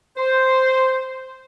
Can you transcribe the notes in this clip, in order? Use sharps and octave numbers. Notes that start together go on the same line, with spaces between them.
C5